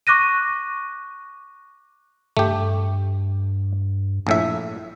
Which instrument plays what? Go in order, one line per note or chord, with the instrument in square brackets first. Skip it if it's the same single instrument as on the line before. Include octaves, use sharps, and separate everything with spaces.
[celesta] C#6 D6 F#6 A#6 D#7
[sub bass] G2 [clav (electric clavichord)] A3 G4
[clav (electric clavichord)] A#1 A2 E5